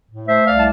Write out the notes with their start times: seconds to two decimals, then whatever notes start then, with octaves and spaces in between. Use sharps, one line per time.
0.10 A2
0.28 A3 C5 E5
0.46 C2 D5 F5
0.58 A5